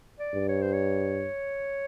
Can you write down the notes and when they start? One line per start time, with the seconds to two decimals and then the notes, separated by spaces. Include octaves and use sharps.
0.19 D5
0.34 G2
0.49 C#5
0.61 C5
0.73 C#5